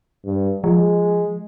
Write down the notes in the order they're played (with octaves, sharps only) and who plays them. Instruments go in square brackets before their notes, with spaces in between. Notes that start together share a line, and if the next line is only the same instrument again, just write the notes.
[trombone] G2
[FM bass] F3 [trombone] G#3